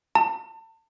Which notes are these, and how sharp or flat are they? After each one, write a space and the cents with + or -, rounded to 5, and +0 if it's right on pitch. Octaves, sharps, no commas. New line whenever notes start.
A5 +35